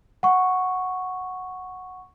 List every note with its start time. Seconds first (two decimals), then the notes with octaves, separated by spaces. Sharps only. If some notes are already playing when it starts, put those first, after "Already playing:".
0.23 F#5 C#6